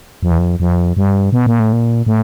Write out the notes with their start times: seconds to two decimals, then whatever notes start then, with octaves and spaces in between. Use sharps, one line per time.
0.23 F2
0.31 E2
0.38 F2
0.60 F2
0.97 G2
1.32 B2
1.46 A#2
1.59 A2
1.73 A#2
2.06 A2